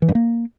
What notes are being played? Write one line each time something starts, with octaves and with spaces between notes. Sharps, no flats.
E3
G2
A#3